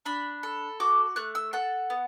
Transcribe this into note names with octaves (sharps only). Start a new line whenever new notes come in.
D4 B5
A4
F#4 D6
A3 F#6
E6
A4 F#5
B3